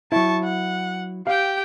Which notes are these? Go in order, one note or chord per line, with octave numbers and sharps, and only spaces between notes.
F#3 E4 A5 C#6
F#5
G4 F5 G5